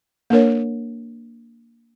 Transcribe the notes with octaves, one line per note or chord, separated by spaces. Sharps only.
A#3 D4 A#4 C#5